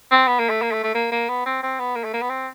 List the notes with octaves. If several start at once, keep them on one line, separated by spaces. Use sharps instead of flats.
C4
B3
A#3
A3
A#3
A3
A3
A#3
A#3
B3
C4
C4
B3
A#3
A3
A#3
B3
C4